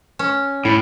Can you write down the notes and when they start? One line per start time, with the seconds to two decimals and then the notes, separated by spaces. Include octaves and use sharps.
0.19 C#4
0.65 A2 E4